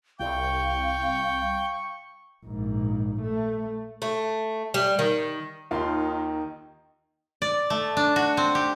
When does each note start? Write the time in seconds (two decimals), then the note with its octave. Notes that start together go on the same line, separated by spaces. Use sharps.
0.19 C2 F5 G5 C#6
2.45 A#1 G#2
3.21 A3
4.02 A3
4.74 G3
4.99 D#3
5.71 D#2 D#3 D#4 F4 C6
7.42 D5
7.70 A3
7.97 D4
8.16 F#4
8.37 C4
8.55 G4